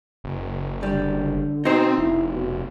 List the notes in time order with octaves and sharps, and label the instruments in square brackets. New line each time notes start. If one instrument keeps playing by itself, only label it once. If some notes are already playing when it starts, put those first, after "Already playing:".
[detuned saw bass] F#1
[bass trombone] D3 [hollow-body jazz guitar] G3
[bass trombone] B2 [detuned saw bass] C4 [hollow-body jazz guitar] D#4 C5
[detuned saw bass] F1 [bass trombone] E4
[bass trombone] B2